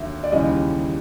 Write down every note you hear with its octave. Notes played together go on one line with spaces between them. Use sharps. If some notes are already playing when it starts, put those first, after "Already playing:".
Already playing: D#2 D3 F#3 E5
D5
D#2 C#3 E3 G3 D#5